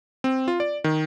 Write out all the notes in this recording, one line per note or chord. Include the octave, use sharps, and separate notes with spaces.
C4
F4
D5
D#3